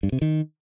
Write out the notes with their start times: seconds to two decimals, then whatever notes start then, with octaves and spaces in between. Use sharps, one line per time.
0.03 G2
0.12 C3
0.22 D#3